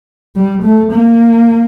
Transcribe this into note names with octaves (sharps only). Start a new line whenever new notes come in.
G3
A3
A#3